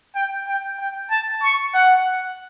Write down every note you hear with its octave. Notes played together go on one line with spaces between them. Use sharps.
G5
G5
G5
A5
C#6
F#5